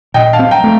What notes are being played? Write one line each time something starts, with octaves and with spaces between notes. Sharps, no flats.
A#2 D#5 G5
F5 A5
C4
G5 A#5
A3